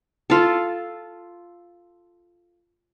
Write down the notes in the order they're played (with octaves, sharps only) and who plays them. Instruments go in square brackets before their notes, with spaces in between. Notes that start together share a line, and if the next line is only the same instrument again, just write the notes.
[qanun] F4 A4